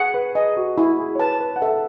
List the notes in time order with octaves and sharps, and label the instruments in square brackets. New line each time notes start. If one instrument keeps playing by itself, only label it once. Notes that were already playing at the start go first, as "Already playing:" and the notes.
Already playing: [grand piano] G#4 [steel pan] F#5
[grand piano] B4
[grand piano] G#4 [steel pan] D#5
[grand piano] F#4
[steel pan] E4 [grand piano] F#4
[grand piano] G#4
C#5
[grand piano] B4 [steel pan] A5
[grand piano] B4
F#5
[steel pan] A4 [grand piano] E5